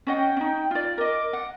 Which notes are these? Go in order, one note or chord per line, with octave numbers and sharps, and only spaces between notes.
C#4 D#5 F#5 G5
C#4 D#4
F4 D5
A#4 D#5 D6
F#5